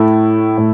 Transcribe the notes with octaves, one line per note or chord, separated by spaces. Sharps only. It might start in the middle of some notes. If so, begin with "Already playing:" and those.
Already playing: A2 A3 E4
A2